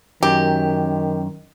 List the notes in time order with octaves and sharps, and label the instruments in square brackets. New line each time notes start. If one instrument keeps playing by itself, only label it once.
[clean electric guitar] F#2 [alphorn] D#3 [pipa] G4